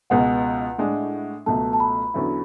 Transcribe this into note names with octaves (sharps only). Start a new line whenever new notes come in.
C#2 B2 G#3 F#5
A2 G#3 D4
C#2 B2 F#3 A3 A5
A5
B5
E2 D3 F#3 C#4 E4